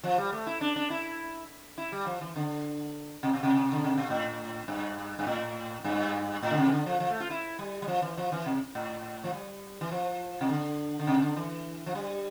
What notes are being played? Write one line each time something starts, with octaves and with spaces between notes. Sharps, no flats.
F3
G3
A3
E4
D4
D4
E4
E4
G3
F3
E3
D3
C3
B2
C3
D3
C3
B2
A2
G2
G2
A2
G2
A2
D3
C3
E3
D3
F3
F3
A3
F4
E4
G3
G3
F3
E3
F3
E3
C3
A2
F3
G3
E3
F3
C3
D3
D3
C3
D3
E3
F3
G3